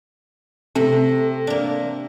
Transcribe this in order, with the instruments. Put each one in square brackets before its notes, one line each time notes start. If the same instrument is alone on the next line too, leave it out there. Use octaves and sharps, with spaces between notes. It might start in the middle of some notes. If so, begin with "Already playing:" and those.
[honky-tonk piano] C3 [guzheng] A3
[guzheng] A#3 D4